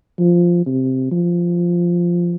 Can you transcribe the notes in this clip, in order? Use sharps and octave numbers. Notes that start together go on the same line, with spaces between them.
F3
C3
F3